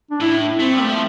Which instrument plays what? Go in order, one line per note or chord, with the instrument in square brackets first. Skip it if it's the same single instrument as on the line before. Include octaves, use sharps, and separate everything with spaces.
[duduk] D4
[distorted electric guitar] A2 [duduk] E4
[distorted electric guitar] A3 [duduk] C4
[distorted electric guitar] G3
[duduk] A3
[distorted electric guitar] F3